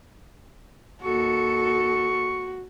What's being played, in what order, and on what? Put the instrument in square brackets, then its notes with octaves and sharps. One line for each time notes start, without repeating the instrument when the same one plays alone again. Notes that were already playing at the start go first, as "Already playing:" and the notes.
[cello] D#2 A4 [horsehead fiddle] F#4 [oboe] C#6